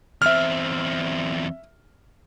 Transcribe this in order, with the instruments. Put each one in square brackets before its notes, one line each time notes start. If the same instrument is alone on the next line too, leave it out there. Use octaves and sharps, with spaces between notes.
[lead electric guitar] E2 C4 [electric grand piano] E5 F6